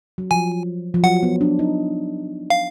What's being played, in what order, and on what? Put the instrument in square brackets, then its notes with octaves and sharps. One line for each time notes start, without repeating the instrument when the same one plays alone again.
[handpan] F#3
[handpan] F3 [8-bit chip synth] G#5
[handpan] F3
[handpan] F#3 [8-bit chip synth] F#5
[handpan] B3
D4
D#4
[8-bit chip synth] F5